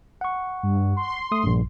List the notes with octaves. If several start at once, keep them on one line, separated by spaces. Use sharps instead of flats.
F#5 C#6
G2
C6
A3 D#6
A#1 G2